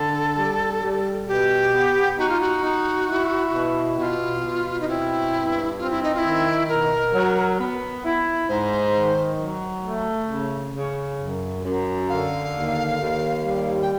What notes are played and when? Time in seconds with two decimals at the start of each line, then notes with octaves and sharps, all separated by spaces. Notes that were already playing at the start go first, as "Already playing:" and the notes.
Already playing: D3 A4
0.37 G3
0.82 G3
1.28 B2 G4
1.73 B3
2.18 D#4 F#4
2.29 F4
2.41 F#4
2.63 D#4
3.08 E4
3.53 B2
3.98 B2 F4 F#4
4.44 B2
4.81 D#4
4.88 C4 E4
5.33 G2
5.79 C4 F4
5.90 E4
6.03 D#4
6.15 F4
6.18 E4
6.24 D#3
6.69 B2 A#4
7.14 F#3
7.59 B3
8.03 E4
8.49 G#2 C5
8.95 D#3
9.40 F#3
9.84 A3
10.29 C#3
10.74 C#3
11.19 F#2
11.65 F#2
12.09 D3 F5
12.54 D#2
13.00 D#2
13.45 G3
13.82 G5